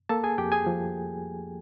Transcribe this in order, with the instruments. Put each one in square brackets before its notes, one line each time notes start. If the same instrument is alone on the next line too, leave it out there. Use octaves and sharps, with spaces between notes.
[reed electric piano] A#3 A4 A5
G#4 G#5
F2 G4 G5
G#4 G#5
F3